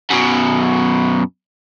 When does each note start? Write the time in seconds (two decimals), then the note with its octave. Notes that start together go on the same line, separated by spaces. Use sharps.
0.11 F#2 B2